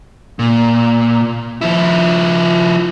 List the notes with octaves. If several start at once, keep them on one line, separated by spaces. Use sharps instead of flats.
A#2
F3 E4